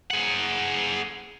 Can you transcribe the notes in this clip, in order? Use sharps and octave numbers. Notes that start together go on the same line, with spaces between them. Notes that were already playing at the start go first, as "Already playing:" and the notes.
G#4 F#5